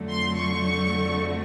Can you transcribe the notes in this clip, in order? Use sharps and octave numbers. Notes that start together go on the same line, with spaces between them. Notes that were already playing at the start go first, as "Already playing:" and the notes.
Already playing: F2 D3 F#3 A3
C6
C#6